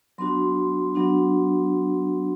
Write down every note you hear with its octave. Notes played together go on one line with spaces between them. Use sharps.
F#3 B3 D4 F#4 C6
F#3 B3 D4 F#4